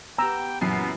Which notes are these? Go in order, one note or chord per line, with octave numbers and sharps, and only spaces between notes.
B3 G4 G5 A#5 E6
F#2 A#2 E3 B3 E4 C7